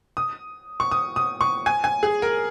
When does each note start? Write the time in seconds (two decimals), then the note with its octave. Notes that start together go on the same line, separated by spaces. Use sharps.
0.17 D#6
0.80 C#6
0.91 D#6
1.16 D#6
1.41 C#6
1.66 G#5
1.84 G#5
2.03 G#4
2.22 A#4